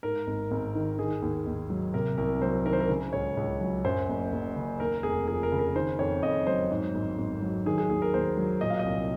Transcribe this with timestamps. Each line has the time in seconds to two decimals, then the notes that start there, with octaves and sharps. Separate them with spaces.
0.03 G#2 A#4
0.27 G#1
0.51 G#1
0.75 D#3
0.99 D#3 G#4
1.22 D#2
1.46 D#2
1.70 F#3
1.94 C3 A#4
2.18 C2 A#4
2.42 F#3 C5
2.65 D#3 A#4
2.73 C5
2.80 A#4
2.89 C#3
3.13 C#2 C#5
3.37 C#2
3.61 F#3
3.84 F#2 C5
4.09 F#1
4.32 F#1
4.56 C#3
4.80 D#2 A#4
5.03 F1 G#4
5.27 F3 G#4
5.43 A#4
5.52 C#3
5.59 A#4
5.75 D#3 C5
5.99 F2 C#5
6.23 F2 D#5
6.47 F#3 C5
6.70 G#2
6.94 G#1
7.18 G#1
7.42 F#3
7.66 D#3 G#4
7.78 G#4
7.89 D#2 G#4
8.02 A#4
8.14 D#2 C5
8.37 F#3
8.61 A#2 D#5
8.70 F5
8.79 D#5
8.85 C2